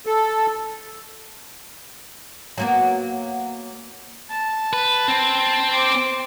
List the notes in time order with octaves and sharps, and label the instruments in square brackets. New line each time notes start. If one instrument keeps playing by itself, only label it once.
[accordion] A4
[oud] F#3 A#3 B3
[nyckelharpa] A5
[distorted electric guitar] B4
C4
[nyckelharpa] C5 D6